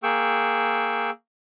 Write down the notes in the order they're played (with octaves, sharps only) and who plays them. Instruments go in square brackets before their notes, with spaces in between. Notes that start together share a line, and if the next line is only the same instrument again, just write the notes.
[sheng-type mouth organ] A#3 G#4 G5 C#6 E6